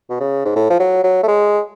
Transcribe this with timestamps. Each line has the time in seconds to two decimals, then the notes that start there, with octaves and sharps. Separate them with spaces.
0.09 B2
0.20 C#3
0.45 G#2
0.56 A2
0.70 F3
0.79 F#3
1.04 F#3
1.23 A3
1.28 G#3